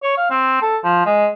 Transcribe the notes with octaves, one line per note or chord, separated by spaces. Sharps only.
C#5
F5
C4
A4
F3
G#3